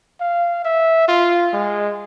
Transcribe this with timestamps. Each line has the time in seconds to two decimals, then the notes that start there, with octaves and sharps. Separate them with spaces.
0.21 F5
0.65 E5
1.08 F4
1.54 G#3